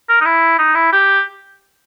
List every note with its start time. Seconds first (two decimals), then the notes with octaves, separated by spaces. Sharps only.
0.09 A#4
0.21 D#4
0.25 E4
0.59 D#4
0.75 E4
0.92 G4